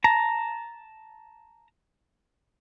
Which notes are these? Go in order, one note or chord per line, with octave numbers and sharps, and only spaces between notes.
A5 A#5